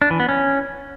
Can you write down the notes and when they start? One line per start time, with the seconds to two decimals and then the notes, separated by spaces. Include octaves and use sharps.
0.02 D4
0.11 E3
0.20 B3
0.29 C#4